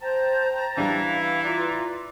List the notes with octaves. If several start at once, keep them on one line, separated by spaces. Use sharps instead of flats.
C5 G5 A5 A#5
E3 G3 D4 F5
F4 D5 A#5